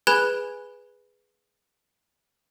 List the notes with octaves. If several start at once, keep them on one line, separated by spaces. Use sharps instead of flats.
G#4 B4 G#5 B5 F#6 G#6